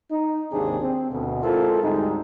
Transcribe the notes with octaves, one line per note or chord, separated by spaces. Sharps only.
D#4
G#1 D#2 C3 C4 D4 G#4
C4
D2 B2
G#3 C4 E4 F4 A4 A#4
D2 G#2 G3 G#3 D#4